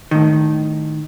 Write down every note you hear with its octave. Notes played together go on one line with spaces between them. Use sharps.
A2 D#3